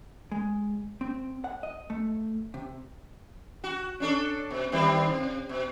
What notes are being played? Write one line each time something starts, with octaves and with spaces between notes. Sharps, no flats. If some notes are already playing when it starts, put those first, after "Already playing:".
G#3
C4
F#5
D#5
A3
C3
F#4
C#4 D4 A4
B2
D#3 G3 C4
C3
B2